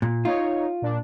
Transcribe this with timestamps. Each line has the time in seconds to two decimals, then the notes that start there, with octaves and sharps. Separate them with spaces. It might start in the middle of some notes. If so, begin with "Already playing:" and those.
0.02 A#2
0.25 D#4 F4 C#5
0.82 A#2 D4